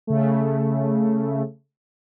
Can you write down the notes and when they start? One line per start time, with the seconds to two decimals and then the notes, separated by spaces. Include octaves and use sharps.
0.07 C#3 A3